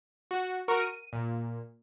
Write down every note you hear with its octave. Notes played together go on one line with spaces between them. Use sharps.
F#4
F#4 A#4 C#6 D7
D#7
A#2